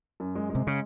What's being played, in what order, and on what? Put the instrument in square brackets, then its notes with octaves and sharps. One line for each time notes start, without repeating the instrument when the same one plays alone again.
[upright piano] F#2
G#3
G#3
[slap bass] C3
C#3